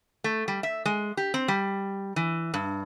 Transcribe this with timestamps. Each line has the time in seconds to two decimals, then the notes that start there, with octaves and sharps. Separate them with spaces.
0.24 A3
0.48 G3
0.63 E5
0.85 G#3
1.17 G4
1.34 C4
1.48 G3
2.16 E3
2.54 G2